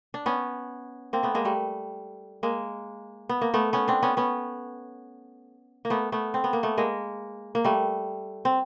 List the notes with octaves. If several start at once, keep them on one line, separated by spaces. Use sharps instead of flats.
D4
B3 C#4
A#3 C4
A3 B3
G#3 A#3
G3 A3
G#3 A#3
B3
A#3
A3 B3
B3 C#4
C4 D4
B3 C#4
B3 C#4
A#3
A3 B3
A3 B3
C4
B3
A#3
A3 B3
G#3 A#3
A#3
G3 A3
C4